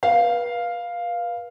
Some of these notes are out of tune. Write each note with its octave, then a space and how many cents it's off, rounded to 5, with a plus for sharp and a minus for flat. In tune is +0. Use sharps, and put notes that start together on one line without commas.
B4 -35 F5 +0